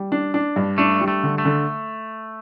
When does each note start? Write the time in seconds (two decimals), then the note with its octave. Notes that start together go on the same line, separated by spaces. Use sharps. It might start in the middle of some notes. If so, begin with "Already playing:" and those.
Already playing: G3
0.12 D4
0.34 D4
0.56 G2
0.78 A3 D4
1.01 G3
1.08 A3
1.23 D3
1.38 A3
1.45 D3